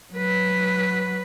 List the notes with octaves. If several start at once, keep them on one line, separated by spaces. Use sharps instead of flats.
F#3 B4